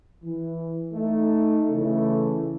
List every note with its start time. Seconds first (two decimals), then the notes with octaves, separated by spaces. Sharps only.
0.23 E3
0.92 A3 D#4
1.69 C#3 E3 A3